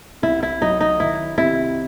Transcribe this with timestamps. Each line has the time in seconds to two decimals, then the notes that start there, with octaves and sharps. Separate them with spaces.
0.22 C2 E4
0.43 E4
0.61 F#3 D#4
0.81 D#4
1.00 D#3 E4
1.38 C3 E4